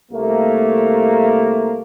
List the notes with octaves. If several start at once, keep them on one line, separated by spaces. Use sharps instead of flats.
C2 A3 A#3